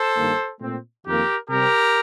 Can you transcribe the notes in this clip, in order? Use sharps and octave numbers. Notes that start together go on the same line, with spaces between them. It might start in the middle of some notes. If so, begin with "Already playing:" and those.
Already playing: A4 C5
G2 D#3 A#3
A#2 A3 C4
F2 D#3 A#3 G4 A#4
C3 G3 C4 G4 A#4